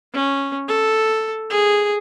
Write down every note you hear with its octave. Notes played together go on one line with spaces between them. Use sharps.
C#4
A4
G#4